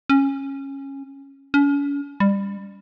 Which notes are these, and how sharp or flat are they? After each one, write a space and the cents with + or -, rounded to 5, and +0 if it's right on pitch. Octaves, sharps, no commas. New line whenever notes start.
C#4 -15
C#4 +40
G3 +25